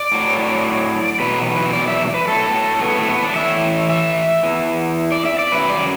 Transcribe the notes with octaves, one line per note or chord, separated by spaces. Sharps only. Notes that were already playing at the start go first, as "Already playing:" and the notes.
Already playing: D5
A2 F#3
E2 B2 F#3 B4
B4
D5
E5
B4
A2 F#3 A4
B3
A3
B3
D4
A2 E3 E5
E5
E2 E3
D5
E5
D5
F#2 F#3 B4
D5